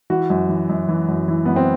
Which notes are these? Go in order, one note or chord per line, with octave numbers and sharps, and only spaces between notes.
E3 F#4
F#2
E3
F#2
E3
F#2
E3
F#2 B3
C4